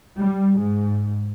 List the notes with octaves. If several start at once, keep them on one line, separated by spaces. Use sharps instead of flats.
G3
G#2